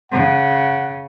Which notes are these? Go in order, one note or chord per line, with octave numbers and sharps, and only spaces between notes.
C#3 F#5